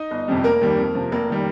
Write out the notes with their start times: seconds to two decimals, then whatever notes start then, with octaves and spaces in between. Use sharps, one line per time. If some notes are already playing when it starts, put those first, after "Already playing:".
Already playing: D#4 D#5
0.11 G1
0.28 F2 C3 G3
0.37 G4
0.44 F1 A#3 A#4
0.61 D#2 D#3 G3
0.78 F2
0.95 C3 F3
1.12 F1 A#3
1.30 D#3 G3